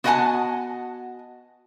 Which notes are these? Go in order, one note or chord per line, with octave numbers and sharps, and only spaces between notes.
B3 F#4 D#5 F#5 G#5 A5